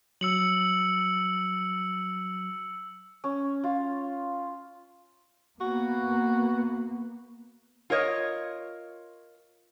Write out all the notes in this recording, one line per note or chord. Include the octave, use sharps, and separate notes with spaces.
F#3 E6 C#7 F#7
C#4
F4
A#3 B3 F#4
F4 A#4 C#5 D#5